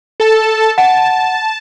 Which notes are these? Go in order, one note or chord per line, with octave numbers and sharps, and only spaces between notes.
A4 A5
F#5 A5